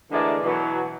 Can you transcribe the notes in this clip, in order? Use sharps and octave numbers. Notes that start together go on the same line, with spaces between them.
D3 E3 G#3 A3 A#4 D5
B2 E3 F#3